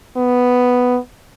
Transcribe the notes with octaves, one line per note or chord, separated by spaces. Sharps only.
B3